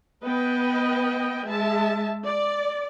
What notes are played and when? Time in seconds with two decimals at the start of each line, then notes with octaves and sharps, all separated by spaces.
0.23 B3 B4 D#5 G5
1.46 G#3 E5 A5
2.26 D5